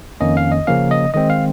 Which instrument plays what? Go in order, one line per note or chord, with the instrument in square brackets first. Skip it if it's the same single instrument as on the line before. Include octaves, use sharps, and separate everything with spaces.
[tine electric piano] F2 D#3 A#3 C#4 D#5
F5
D#5
C#3 F3 A#3 C#4 F5
D#5
D#3 G#3 C4 D#5
F5